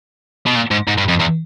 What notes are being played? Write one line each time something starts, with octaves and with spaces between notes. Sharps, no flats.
B2
A#2
G#2
G#2
G2
F2
E2